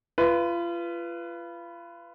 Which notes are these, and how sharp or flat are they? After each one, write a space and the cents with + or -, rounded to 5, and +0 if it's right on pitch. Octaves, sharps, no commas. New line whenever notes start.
F4 -30 B4 +0